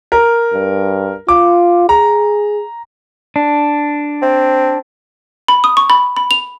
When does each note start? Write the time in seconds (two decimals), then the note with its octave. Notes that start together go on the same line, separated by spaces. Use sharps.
0.12 A#4
0.53 G2
1.29 F4 D6
1.89 G#4 A#5
3.36 D4
4.22 C4
5.48 B5
5.64 D#6
5.77 C#6
5.90 B5
6.17 B5
6.31 F7